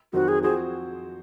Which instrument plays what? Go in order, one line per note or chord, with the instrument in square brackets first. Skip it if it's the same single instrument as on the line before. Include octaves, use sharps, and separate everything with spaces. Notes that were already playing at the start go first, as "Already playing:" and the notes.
[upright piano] F2 D#3 F#3 C4 [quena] F#4
[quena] G#4
[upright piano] F3 C4 F#4 C5 [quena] G#4